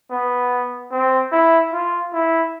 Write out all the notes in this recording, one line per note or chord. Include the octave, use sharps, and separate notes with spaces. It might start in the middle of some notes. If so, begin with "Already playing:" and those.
B3
C4
E4
F4
E4